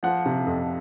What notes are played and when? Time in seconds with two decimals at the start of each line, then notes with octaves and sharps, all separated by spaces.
0.03 F3 F#5
0.26 C3
0.47 F2